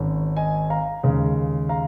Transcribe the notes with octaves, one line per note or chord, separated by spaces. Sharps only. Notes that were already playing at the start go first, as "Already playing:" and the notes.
Already playing: G#1 G#2 G#3 C#4
D#5 G#5
F5 A#5
D#2 C#3 G#3
F5 A#5